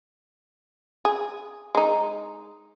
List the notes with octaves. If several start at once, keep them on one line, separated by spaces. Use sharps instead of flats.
G#4
G#3 D#4